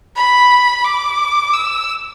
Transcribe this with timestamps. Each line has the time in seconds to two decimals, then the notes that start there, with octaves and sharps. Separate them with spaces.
0.16 B5
0.85 D6
1.53 E6